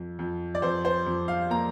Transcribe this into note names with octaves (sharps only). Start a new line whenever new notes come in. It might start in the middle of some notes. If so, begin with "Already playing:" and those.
Already playing: F2
F2
D5
F2 C5
C5
F2
F5
A#3 A#5